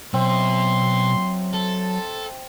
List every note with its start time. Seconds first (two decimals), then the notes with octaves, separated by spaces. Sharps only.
0.14 B2 F#3 C4 E5 C6
1.53 A4 A5